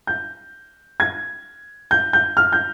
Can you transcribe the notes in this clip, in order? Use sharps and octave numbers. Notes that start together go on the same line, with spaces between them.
G6
G#6
G6
G6
F6
G6